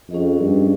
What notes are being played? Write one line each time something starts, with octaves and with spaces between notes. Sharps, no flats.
F2 C#4 G#4 D#5
G2